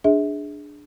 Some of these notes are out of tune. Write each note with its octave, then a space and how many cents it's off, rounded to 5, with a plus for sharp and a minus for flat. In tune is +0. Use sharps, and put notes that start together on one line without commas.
D4 +5 G#4 +0 E5 -40